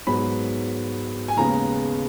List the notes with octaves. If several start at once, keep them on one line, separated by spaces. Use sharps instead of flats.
G#2 F#3 B3 B5
G#5
D#2 C#3 G#3 B3 A#5